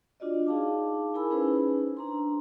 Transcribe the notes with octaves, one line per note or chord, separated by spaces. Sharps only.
D4 F4 F#4 D5 D#5
D#4 G#4 F5 A5 D6
E4 G#4 A#4 G#5 B5 E6
C#4 D#4 G#4 B4 C5
D4 A#5 C6